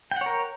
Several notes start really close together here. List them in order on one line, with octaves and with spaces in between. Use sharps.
G5 F#5 C#5 A#4